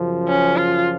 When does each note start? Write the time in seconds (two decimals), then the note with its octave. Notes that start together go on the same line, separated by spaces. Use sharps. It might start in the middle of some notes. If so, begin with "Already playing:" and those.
Already playing: F#2 C#3 F3
0.28 C#4
0.57 F4